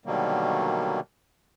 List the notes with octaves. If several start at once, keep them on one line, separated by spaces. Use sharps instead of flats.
B2 D3 D#3 F#3 G3 A#3